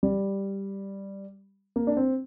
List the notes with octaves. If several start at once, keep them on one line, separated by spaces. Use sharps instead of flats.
G3
A#3
D4
C4